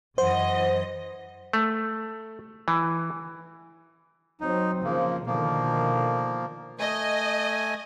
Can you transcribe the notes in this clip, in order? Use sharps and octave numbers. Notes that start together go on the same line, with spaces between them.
F#2 E3 C5 D#5 F#5
A3
E3
F#3 C4 D#4
C#3 F3 A#3
B2 D3 D#3 F3 A#3
A3 D#5 G#5